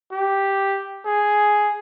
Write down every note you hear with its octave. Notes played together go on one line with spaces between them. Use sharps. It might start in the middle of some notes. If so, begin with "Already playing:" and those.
G4
G#4